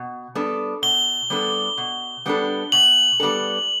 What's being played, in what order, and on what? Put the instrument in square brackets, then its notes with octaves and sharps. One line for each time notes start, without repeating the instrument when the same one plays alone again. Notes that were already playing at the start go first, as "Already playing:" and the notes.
Already playing: [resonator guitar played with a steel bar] B2
G3 B3 D4 A4
[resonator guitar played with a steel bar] B2 [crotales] G7
[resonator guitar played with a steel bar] G3 B3 D4 A4
B2
G3 B3 D4 A4
[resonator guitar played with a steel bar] B2 [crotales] F#7
[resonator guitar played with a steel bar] G3 B3 D4 A4